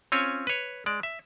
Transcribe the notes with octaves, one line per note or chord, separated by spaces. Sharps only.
C4 C#4 F4 C#5 G#5
B4 C#5
G#3 D5
E5